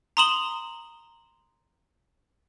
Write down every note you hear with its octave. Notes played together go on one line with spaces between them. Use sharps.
A#5 C6 D#6 E7 F#7 G7